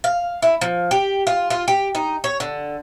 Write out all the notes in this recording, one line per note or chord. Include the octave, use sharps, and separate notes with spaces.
F5
E4
F3
G4
F4
F4
G4
D#4
C#5
D3